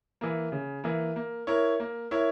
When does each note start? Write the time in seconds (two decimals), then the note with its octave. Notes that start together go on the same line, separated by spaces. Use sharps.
0.21 E3 A#3
0.52 C#3
0.84 E3 A#3
1.16 A#3
1.47 E4 A#4 C#5
1.80 A#3
2.11 E4 A#4 C#5